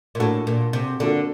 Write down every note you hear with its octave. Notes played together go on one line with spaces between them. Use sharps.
A#2
A2 A#3 D4 F#4 A4
A#2
C3
D3 A#3 D4 F#4 A4